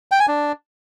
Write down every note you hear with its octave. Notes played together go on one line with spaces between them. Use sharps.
G5
G#5
D4